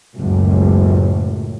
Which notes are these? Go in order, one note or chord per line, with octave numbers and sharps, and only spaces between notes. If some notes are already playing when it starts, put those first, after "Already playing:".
F#1 C#2 A2